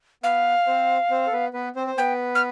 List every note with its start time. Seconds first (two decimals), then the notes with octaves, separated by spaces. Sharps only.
0.23 B3 B4 F5
0.67 C4 C5
1.10 C4 C5
1.27 A4
1.33 B3 B4
1.53 B3 B4
1.76 C4 C5
1.87 C5
1.98 B3 B4 G5
2.35 F6